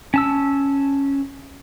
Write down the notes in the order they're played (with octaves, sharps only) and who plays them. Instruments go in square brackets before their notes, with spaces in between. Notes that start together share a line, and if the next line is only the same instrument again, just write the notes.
[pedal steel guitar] C#4 A5 E6